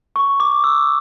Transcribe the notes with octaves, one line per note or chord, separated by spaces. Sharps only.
C#6
D6
E6